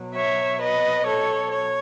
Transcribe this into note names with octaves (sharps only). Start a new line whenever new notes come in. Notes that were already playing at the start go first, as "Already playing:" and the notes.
Already playing: B2 F#3
C#5 E5
B4 D#5
A4 C#5
C#5